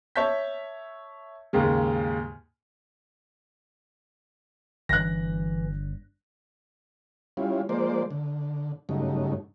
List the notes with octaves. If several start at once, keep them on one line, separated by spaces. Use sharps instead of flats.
C#5 E5 A5 G6 B6
D#2 G#2 C#3 A#3
G1 E3 D4 F#6 A#6
G3 C#4 E4 F4
F3 G#3 A#3 C5 D5
D3
G2 C#3 F#3 A3 D#4